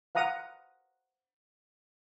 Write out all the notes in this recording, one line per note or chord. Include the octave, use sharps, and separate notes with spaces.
F5 F#5 A#5 D#6